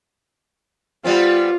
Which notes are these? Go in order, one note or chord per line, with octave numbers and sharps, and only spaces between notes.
G3 B3 C4 F4